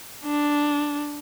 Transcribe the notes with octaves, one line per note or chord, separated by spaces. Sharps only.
D4